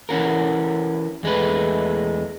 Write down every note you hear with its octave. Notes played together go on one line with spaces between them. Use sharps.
E3 C#4 F#4 A#4
E2 G#3 A3 B4